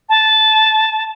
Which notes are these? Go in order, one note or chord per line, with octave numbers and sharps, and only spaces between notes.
A5